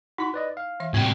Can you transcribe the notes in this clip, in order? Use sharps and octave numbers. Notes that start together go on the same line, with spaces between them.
D#4 E4 F#4 B5 B6
B4 D5 D#5
F5
E3 E5
A2 C3 G3 C4 F#4 G5